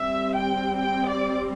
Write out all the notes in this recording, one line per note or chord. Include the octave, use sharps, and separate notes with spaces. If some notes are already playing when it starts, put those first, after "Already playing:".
Already playing: G3 C4 E5
G5
G5
D5